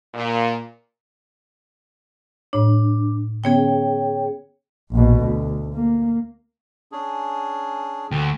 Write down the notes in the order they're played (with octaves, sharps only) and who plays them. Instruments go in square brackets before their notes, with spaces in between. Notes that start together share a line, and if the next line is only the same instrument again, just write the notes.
[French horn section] A#2
[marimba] A2 C#5 [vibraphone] D4
[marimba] D3 B3 C#4 [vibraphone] G#4 C#5 G5
[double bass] A#1 B2
D2
A#3
[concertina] C#4 D4 G#4
[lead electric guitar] D2 [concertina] G5